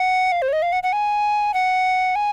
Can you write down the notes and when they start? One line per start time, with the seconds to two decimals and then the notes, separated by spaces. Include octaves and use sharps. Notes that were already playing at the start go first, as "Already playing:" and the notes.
Already playing: F#5
0.32 F5
0.42 C5
0.48 C#5
0.53 D#5
0.62 F5
0.72 F#5
0.83 F#5
0.93 G#5
1.54 F#5
2.15 G#5